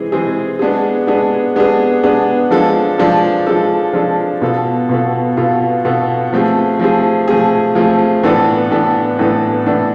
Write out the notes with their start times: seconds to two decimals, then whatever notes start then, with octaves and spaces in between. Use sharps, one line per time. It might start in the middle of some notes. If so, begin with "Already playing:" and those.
Already playing: E3 G#3 C4 G#4
0.12 E3 G#3 C4 G#4
0.59 G#3 B3 D4 G#4
1.07 G#3 B3 D4 G#4
1.56 G#3 B3 D4 G#4
2.03 G#3 B3 D4 G#4
2.51 F3 G#3 D4 A4
2.98 F3 G#3 D4 A4
3.46 F3 G#3 D4 A4
3.93 F3 G#3 D4 A4
4.41 B2 B3 F4 A4
4.89 B2 B3 F4 A4
5.37 B2 B3 F4 A4
5.85 B2 B3 F4 A4
6.32 F3 A3 C4 G#4
6.79 F3 A3 C4 G#4
7.28 F3 A3 C4 G#4
7.75 F3 A3 C4 G#4
8.23 A2 E3 B3 D4 A4
8.70 A2 E3 B3 D4 A4
9.19 A2 E3 B3 D4 A4
9.66 A2 E3 B3 D4 A4